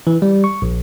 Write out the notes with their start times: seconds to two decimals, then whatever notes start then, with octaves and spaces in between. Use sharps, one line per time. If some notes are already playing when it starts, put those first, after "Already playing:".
0.07 E3
0.22 G3
0.44 C#6
0.62 A#1